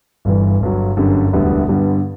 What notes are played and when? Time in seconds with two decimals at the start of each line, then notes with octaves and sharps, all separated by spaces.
0.25 G1 G2 E3
0.60 G1 G2 F#3
0.97 G1 F#2 D3 G3
1.33 E1 D2 D3 G3 B3
1.69 G2 D3 G3 B3